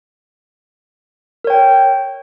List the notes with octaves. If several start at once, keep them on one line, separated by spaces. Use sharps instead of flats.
A#4 C#5 G5